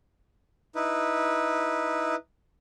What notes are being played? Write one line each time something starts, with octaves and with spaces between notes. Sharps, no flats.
D#4 E4 B4